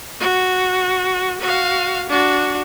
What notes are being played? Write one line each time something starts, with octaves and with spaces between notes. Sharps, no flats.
F#4
F#4 F5
D4 F#4